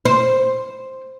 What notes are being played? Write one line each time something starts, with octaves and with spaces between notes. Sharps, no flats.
C5